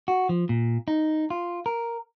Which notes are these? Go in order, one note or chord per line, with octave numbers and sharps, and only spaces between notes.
F#4
F3
A#2
D#4
F4
A#4